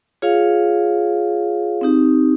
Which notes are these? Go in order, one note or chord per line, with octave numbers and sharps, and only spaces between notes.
F4 G#4 C#5 F5
C4 D#4 G4